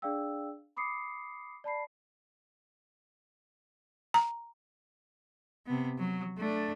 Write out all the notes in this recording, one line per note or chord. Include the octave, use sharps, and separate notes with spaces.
D4 G#4 D5 F5 G5 E6
B5 D6 D#6 C7 C#7
D5 A5 B5 C7
A#5
C3 B3
F#3
A3 D4